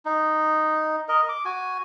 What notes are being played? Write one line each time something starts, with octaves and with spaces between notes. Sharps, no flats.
D#4
A#4 D#5
D6
F#4 G#5